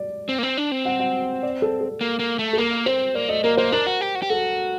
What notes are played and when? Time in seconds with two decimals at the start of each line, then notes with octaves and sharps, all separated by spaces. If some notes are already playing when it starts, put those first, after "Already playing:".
Already playing: D5
0.29 C4
0.38 A#3
0.43 C4
0.57 D4
0.72 C4
0.85 F#5
1.00 F#5
1.43 D5
1.62 A4
1.81 A4
2.01 A#3
2.19 A#3
2.39 A3
2.53 A4
2.57 A#3 A#4
2.86 C4 C5
3.15 A#3 D5
3.29 A3 D#5
3.44 A#3 A#4
3.57 A#3 C5
3.72 D4 A#4
3.87 F#4
4.01 G4
4.15 F#4
4.22 G4
4.30 F#4 A4